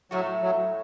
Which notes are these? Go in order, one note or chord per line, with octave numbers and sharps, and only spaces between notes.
A2 F#3 A3 F#4
F#3